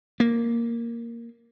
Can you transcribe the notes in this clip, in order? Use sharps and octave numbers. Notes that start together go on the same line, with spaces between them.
A#3